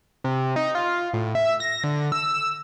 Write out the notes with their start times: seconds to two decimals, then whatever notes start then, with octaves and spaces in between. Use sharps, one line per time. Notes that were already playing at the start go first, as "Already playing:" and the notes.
0.24 C3
0.56 D#4
0.75 F4
1.13 A2
1.35 E5
1.60 A#6
1.84 D3
2.12 E6